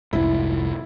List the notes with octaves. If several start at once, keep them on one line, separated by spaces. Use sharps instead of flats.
F1 C2 G#2 E4